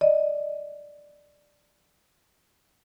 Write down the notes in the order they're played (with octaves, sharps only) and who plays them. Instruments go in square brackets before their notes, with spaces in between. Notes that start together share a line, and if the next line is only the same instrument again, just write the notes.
[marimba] D5 D#5